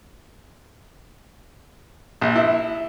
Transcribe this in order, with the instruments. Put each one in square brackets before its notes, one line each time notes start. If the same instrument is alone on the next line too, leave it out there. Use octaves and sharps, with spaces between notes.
[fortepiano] A#1
E4